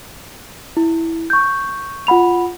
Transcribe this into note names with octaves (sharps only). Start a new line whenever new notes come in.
E4
C#6 G6
F4 F#5 B5 F7